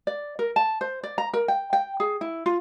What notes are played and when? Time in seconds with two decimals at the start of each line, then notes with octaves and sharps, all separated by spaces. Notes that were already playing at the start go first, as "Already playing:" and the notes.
0.07 D5
0.39 A#4
0.56 A5
0.81 C5
1.03 D5
1.18 A#5
1.34 A#4
1.48 G5
1.73 G5
2.00 G#4
2.21 E4
2.46 F4